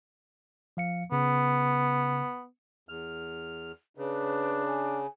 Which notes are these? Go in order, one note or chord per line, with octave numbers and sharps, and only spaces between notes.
F3 F5 C#7
C#3 B3
E2 F6
C#3 D4 B4
G#5